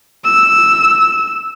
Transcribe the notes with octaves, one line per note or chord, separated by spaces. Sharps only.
E6